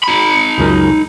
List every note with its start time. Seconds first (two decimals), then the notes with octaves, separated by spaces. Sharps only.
0.03 D#4 B5
0.58 C#2 F#2 A#4